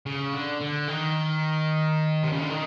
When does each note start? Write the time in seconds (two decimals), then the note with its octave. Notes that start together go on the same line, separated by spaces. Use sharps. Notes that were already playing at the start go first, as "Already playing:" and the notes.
0.06 C#3
0.33 D3
0.61 D3
0.88 D#3
2.23 C3
2.32 C#3
2.41 D3
2.49 D#3